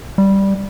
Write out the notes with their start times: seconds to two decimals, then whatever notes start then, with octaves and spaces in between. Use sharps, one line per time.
0.18 G3